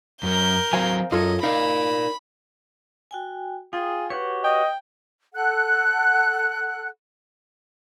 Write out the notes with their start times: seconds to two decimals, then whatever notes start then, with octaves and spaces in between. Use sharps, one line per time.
0.23 F#2 F#3 A#4 G6
0.73 F#3 C4 C5 F5 G#5
1.12 F#2 F4 A4 C#5 D#5
1.43 D#4 A#4 D5 F5 B5
3.11 F#4 G5 G#5
3.73 F4 G#4 G5
4.10 F#4 G4 B4 C#5
4.44 D#5 G5
5.34 A4 F#5 F#6